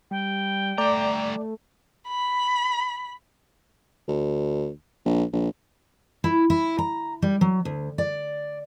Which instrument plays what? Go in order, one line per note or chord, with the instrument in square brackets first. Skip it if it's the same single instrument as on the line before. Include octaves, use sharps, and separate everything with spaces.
[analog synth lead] G3 [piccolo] G5
[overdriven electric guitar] G3 A#5 [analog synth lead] A3 [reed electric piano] D5
[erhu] B5
[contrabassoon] D2
A#1
A#1
[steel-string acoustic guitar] E4
E4
A#5
G3
F#3
D2
D5